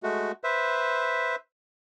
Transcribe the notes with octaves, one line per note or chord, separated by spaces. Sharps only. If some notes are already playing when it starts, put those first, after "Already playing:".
G#3 A3 F#4
B4 C5 E5